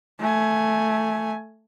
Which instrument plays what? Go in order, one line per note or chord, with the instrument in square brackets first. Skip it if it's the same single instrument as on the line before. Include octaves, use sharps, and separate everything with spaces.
[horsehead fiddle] A3 G#5